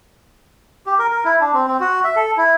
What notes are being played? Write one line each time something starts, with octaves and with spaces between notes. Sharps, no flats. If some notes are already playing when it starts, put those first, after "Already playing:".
G4
A#4
A#4
E4
D4
C4
C4
F#4
E5
A4
E4